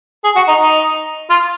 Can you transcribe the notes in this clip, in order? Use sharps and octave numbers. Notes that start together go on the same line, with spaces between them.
G#4
F#4
D#4
D#4
F4